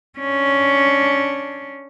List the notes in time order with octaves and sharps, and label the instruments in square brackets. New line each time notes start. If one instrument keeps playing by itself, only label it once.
[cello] C#4 D4